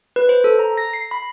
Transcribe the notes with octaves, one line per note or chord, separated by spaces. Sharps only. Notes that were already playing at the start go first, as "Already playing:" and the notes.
B4
C5
A4
A#5
A#6
C7
B5